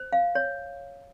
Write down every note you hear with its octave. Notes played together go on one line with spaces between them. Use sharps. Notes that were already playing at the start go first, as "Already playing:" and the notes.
Already playing: C5
F5
C#5